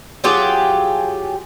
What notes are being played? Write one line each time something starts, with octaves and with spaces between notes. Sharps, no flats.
F#3 F4 G4 G#4